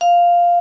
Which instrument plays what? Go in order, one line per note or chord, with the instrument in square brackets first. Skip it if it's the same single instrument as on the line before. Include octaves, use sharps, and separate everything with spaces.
[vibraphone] F5